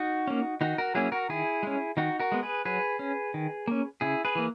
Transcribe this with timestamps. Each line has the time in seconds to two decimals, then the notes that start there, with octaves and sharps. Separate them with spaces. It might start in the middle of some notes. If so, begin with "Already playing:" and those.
Already playing: D#4 F#4
0.27 A#3 C#4
0.61 D#3 D#4 F#4
0.78 F#4 A#4
0.95 F#3 A#3 C#4 E4 G#4
1.12 F#4 A#4
1.29 D#3 E4 G#4
1.63 G#3 C#4
1.97 D#3 D#4 F#4
2.20 F#4 A#4
2.32 G#3 B3
2.43 G#4 B4
2.65 F#3 G#4 B4
2.99 C#4
3.34 D#3
3.68 A#3 C#4
4.01 C#3 E4 G#4
4.25 G#4 B4
4.35 E3 A#3